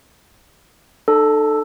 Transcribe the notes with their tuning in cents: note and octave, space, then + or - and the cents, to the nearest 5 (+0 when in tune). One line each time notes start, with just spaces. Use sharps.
D#4 -45 A4 +0